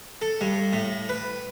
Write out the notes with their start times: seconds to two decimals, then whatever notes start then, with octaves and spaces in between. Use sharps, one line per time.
0.21 A4
0.41 G2
0.73 A2
1.09 B4